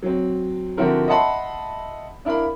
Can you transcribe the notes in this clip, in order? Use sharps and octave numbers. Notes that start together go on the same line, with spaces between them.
F#3 C4
D3 F3 C4 E4 F#4 A#4
D#5 E5 F#5 A5 B5 C6
D4 E4 A#4 F5 B5